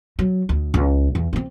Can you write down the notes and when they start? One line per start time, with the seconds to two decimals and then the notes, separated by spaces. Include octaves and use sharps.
0.19 F#3
0.49 D2
0.74 C#2
1.15 E2
1.33 G2 C4